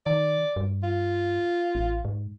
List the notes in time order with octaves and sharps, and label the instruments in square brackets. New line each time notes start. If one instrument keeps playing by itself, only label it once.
[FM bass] D#3 [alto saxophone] D5
[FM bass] G2
[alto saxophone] F4
[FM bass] A1
G#2